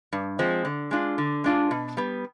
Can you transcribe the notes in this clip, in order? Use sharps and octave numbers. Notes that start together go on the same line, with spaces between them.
G2
F3 G#3 C4
D3
G#3 D4 F4
D3
G#3 D4 F4
B2
G3 B3